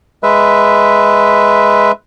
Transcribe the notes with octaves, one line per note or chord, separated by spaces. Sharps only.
G#3 B4 E5